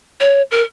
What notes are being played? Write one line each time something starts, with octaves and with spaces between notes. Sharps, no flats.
C#5
A#4